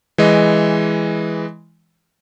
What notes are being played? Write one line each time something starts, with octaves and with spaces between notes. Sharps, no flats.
E3 G#3 D#5